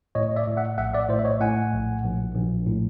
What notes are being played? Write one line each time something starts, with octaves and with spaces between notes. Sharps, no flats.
A2 C#5 D#5
D5 E5
A2
E5 F#5
A#1 E5 F#5
D5 E5
A2 C5 D5
E5
C#5 D#5
A2 F#5 G#5
A#1
A#1
A#1
A2